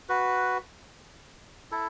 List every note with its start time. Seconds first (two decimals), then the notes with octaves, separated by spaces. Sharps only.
0.09 F#4 B4
1.71 E4 A4